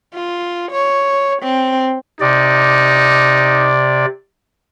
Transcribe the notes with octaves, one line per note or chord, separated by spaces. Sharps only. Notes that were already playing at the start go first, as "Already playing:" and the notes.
F4
C#5
C4
C3 D#4 D5